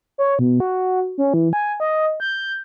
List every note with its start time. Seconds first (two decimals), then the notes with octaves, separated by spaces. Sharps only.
0.18 C#5
0.39 B2
0.60 F#4
1.18 C#4
1.34 E3
1.53 G#5
1.80 D#5
2.20 G6